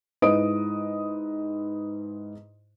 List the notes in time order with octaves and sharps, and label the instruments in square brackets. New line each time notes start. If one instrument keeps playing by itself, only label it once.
[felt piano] G#2 E4 B4 D#5 D#6 D7